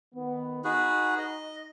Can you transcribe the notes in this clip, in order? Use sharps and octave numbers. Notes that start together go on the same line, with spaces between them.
D#3 B3
D#4 F#4 G#4 B4
D#5